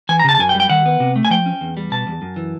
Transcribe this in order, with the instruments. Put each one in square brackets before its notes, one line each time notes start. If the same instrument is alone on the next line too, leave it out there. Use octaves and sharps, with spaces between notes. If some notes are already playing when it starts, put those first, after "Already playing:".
[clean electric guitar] E3 G#5
A#5
C#3 A5
A5
F#2 G#5
G5
G3
G5
D#3 F#5
B3
C3
A3
G#5
F3 G5
C#4
E2
G3
B2 A5
E2
F#2
E3